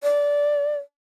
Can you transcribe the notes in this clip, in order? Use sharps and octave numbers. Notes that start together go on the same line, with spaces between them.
D5